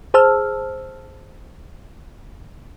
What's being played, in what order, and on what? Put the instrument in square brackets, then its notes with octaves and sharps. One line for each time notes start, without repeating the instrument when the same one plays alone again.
[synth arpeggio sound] G#4 C5 A5 E6 F6